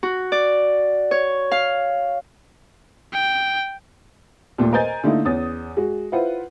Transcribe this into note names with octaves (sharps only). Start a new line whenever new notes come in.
F#4
D5
C#5
F5
G5
D#2 A#2 G3 A3
A#4 C5 D#5 G#5 G6 A6
D3 A3 A#3 D#4 E4
E2 C#4 D#6 A6
G#3 F#4
E4 F4 B4 C5 F#5